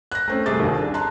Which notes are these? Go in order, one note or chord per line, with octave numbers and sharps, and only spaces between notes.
F#6 A#6
A3 C4 C#4
C2 A3 G#4 E5 D6 A6
A#1 D#2 A#2
D4
A5 A#5 C6 F#6